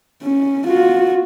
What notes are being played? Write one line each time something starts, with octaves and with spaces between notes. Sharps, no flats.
C#4
F4 F#4